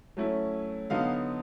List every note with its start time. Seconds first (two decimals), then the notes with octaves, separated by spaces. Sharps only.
0.17 F#3 A3 C#4 E4
0.90 D3 F#3 B3 D#4 F5